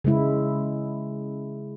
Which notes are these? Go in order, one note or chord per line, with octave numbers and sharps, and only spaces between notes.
C#3 G#3 E4